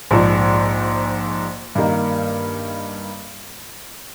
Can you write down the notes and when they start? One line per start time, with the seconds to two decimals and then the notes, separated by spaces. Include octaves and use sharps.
0.11 A#1 G#2 F3
1.75 G2 D#3 A#3